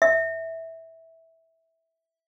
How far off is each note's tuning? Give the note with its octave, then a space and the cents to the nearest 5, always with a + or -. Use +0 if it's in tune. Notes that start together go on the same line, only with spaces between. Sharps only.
E5 -10